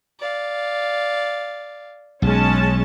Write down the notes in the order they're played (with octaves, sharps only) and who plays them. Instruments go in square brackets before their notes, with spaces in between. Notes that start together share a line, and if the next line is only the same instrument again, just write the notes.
[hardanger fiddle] D5 F5
[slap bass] B1 [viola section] G#3 C#4 A5